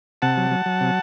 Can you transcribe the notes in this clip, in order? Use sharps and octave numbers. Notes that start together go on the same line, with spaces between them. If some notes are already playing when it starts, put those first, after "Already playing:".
C3 F#5 A5
F#3
F#3
F#3
C3